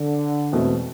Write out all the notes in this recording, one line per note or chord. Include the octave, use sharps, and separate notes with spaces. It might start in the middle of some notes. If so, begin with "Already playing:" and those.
Already playing: D3
E1 E2 B2 A3 C4